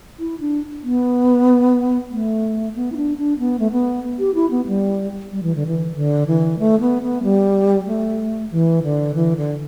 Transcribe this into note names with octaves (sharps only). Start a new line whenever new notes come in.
E4
D4
B3
A3
B3
E4
D4
D4
B3
A3
B3
G4
E4
B3
G3
G3
E3
D3
E3
D3
E3
A3
B3
B3
G3
A3
E3
D3
E3
D3